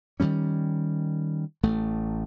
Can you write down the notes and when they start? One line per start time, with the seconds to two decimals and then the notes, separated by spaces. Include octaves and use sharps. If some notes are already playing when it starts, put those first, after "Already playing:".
0.20 D#3 F#3 G3 C#4
1.63 A1 A3